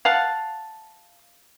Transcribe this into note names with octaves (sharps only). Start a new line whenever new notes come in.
F5 F#5 A5